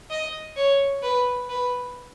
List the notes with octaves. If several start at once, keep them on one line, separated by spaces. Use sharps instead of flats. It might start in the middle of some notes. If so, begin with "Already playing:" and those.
D#5
C#5
B4
B4